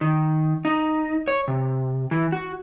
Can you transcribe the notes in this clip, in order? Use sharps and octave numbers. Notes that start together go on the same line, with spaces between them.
D#3
D#4
C#5
C3
E3
F#4